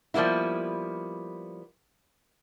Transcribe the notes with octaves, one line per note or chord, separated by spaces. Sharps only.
F3 G3 A#3 B3 E4